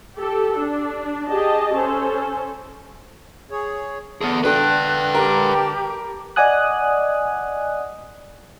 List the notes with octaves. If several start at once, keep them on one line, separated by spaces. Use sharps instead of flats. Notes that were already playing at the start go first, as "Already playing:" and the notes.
G4 A4
D4
G4 G#4 D#5 A5
C#4 A4 C5
G#4 C#5
D3 B3 G#4 A5
D4 A4 B4 G5 F#6
G4 A#4
D5 D#5 F#5 G#5 D#6 F#6